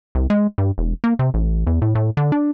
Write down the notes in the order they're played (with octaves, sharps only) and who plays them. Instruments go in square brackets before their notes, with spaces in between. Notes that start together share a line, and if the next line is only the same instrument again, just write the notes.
[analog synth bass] C2
G#3
G2
E1
A#3
C3
A1
E2
A2
A2
D3
D4